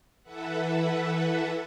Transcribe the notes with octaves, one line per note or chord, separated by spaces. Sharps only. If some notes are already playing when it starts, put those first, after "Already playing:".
E3 A4 B4 E5 F#5